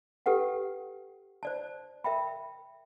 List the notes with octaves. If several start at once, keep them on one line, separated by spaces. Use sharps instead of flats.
G4 A4 B4 F#5 G5
C5 D5 A5
A#4 E5 G5 B5